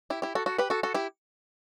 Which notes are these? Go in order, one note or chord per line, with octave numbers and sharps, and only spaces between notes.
E4 G4
E4 G4
F#4 A4
F#4 A4
G4 B4
F#4 A4
F#4 A4
E4 G4